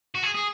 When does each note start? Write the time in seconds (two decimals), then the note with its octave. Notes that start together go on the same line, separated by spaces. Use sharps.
0.15 F#4
0.23 G#4
0.35 G#4